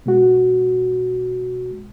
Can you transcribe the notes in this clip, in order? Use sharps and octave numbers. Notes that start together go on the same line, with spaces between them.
B2 G#3 F#4